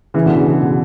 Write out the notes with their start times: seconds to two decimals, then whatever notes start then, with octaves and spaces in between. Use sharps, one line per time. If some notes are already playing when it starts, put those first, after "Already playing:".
0.14 C#3 E3
0.26 B2 D3
0.38 C#3
0.50 C#3
0.62 B2